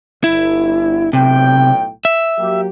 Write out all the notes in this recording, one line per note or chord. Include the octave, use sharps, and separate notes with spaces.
G1 E4
B1 A2 C3 G5
E5
F#3 A#3 G4